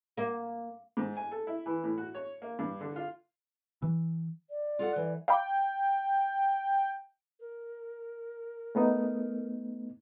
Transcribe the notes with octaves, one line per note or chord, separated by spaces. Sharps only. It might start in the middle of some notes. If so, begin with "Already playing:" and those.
A#3
G#2
G#5
A4
E4
E3
A2
F#4
C#5
A#3
G2
D3
F4
E3
D5
F4 A4 F#5
E3
F5 G5 B5 D6
A#4
A3 B3 D#4